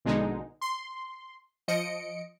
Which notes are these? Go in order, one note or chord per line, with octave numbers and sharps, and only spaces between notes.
A#1 B2 D3 G#3 D#4
C6
F3 D#5 C#7 D7